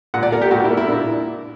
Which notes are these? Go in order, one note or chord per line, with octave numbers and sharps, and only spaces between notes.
A#2 F#5
D5
A#3 A#4
G4
A#2 F#4
E4
A#3
E4
A#2 D4